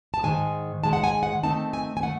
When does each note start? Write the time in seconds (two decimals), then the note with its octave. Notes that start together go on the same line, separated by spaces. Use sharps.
0.14 A5
0.23 G#2 D#3 G#3 G#5
0.83 G#2 D#3 G#3 A5
0.93 F#5
1.04 G#5
1.23 F#5
1.43 D#3 A3 C4 D#4 A5
1.73 G#5
1.97 G#5
2.03 D#3 A3 F#5